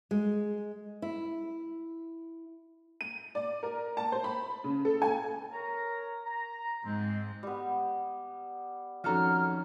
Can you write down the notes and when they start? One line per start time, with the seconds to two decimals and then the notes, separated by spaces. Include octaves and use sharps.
0.11 G#3
1.02 E4
3.01 D#7
3.35 D5
3.63 A#4
3.97 A5
4.12 C5
4.24 B5
4.64 C#3
4.85 A4
5.02 G#5
5.52 A#4 C#5 A#5
6.26 A#5
6.85 G#2 G#3 C4
7.43 G3 B3
9.04 F2 D#3 C#4 F#4 A4 A#5 F6